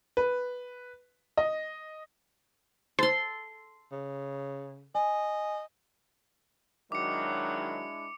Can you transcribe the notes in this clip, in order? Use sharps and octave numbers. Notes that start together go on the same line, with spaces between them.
B4
D#5
A4 C5 C6
C#3
D#5 G#5
D#3 F#3 G#3 D4 E4 D6 C#7